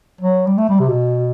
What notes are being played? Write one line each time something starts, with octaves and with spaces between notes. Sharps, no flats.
F#3
G3
A3
G3
C3
B2